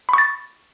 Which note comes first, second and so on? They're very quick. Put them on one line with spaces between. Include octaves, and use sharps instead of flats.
B5 C#6 A6